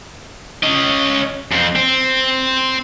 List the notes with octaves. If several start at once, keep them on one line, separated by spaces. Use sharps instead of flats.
C#4 D#5
F2 C4
C4